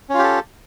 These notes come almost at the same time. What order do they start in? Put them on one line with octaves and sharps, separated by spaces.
C#4 F4 G4 A4